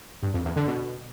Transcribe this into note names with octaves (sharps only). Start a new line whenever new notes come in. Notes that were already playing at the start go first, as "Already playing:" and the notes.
G2
F2
E2
D3
B2